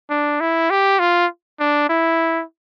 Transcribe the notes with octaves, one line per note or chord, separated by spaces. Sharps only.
D4
E4
G4
F4
D4
E4